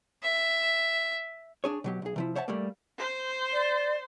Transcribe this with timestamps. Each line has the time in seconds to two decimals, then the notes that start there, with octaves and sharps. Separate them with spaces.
0.23 E5
1.64 D4 G#4 C#5
1.84 B2 F#3 G4
2.02 B1 G#4
2.16 C3 F3 E4
2.35 C5 C#5 E5 F#5 A5
2.48 G3 A3 A#3
2.98 C5
3.53 D5